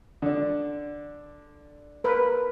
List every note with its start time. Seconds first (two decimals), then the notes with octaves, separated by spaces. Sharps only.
0.22 D3 D4
2.04 A#4 B4